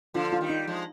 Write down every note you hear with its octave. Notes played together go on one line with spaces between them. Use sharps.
D3 F3 F4
F4
D#3 G3
D#4
F3 G#3